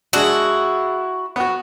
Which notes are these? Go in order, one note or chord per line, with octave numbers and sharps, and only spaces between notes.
G#3 D4 E4 F#4
B3 F#4